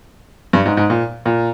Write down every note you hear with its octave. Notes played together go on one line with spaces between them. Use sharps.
G2
G#2
G#2
A#2
A#2